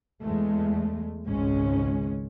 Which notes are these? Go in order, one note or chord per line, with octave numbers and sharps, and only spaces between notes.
E2 G#3 A3
G#1 C#2 G#2 G#3 C#4